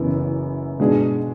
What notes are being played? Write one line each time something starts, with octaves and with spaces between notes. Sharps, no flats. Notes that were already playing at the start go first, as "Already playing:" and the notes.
Already playing: F#1 F#2 E3 B3 E4
B2 G#3 D4 G#4